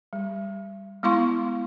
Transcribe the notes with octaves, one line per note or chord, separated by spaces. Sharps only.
G3
G#3 B3 E4 F5 C6 C#6